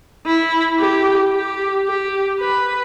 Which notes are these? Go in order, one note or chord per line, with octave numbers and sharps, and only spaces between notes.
E4
G4
G4
G4
B4